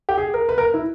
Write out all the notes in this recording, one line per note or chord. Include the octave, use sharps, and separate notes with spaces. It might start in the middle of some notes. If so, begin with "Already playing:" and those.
G4
G#4
A#4
B4
A#4
E4